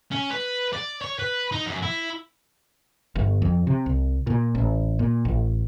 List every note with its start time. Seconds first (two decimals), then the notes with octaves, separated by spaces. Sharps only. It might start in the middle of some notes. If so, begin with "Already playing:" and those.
0.12 C#4
0.30 B4
0.73 D5
1.02 C#5
1.19 B4
1.52 D#4
1.66 F#2
1.82 E4
3.16 G1
3.42 F2
3.67 C3
3.86 C2
4.27 A#2
4.55 A1
4.99 A#2
5.25 A1